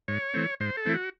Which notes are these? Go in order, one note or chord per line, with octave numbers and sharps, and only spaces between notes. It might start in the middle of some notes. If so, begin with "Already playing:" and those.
G#2 C#5
E3 A3 C4
G#2 C5
A4
E3 A3 C4 E4
F#4